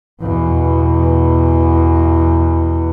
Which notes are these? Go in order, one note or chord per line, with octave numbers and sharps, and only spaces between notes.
E2 B2